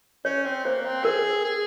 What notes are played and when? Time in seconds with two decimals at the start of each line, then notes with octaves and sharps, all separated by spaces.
0.25 C#4 C#5
0.45 C4
0.65 A#3 C5
0.85 C4
1.04 G#4 A#4
1.44 G#4